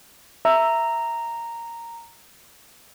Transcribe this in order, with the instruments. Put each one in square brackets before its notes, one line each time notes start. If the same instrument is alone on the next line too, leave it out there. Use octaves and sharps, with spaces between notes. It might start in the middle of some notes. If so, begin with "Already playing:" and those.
[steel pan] E5 [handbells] A#5